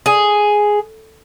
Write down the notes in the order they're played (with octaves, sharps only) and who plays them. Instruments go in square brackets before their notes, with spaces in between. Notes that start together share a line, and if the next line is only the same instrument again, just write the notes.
[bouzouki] G#4